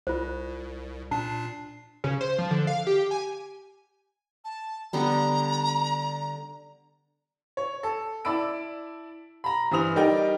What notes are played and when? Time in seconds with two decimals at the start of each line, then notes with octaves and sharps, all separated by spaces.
0.07 C2 F4 C5
1.11 A#2 D4 A5 C7
2.04 C#3
2.21 C5
2.38 F3
2.51 D3
2.67 F5
2.87 G4
3.11 G#5
4.44 A5
4.93 D3 G3 B3 A#5
7.57 C#5
7.83 A4
8.25 E4 D5 A5 B5 E6 D7
9.44 A#5 B5
9.71 G2 E3 C5 D#6 F7
9.96 G3 D#4 A#4 D5 G5